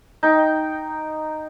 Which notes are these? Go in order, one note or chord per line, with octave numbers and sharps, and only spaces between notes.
D#4 G5